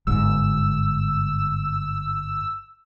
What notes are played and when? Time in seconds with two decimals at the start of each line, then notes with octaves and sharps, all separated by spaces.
0.07 G1 G#2 E6